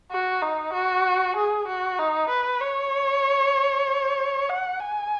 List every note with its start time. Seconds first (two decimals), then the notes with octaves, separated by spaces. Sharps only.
0.11 F#4
0.42 D#4
0.73 F#4
1.36 G#4
1.68 F#4
1.99 D#4
2.29 B4
2.61 C#5
4.50 F#5
4.80 G#5